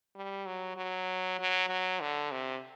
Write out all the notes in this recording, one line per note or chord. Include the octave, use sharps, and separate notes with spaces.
G3
F#3
F#3
F#3
F#3
D3
C3